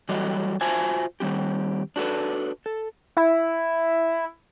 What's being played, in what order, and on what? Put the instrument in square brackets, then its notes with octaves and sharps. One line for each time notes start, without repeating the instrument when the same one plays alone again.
[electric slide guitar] E3 F#3 G3 F#4 A4 D#5
F4 F#4 C5 E5 G#5 A5
D#3 G3 C4 G4
D4 F#4 G4 A4 B4
A4
[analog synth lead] E4